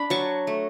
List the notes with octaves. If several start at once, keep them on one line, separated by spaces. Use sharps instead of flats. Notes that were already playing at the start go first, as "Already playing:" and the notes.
Already playing: D4 B5
F#3 A5 C#6
A3